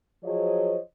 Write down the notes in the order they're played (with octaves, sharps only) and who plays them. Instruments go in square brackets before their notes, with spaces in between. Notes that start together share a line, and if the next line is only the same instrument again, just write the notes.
[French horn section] F3 F#3 G#4 C5 C#5 D#5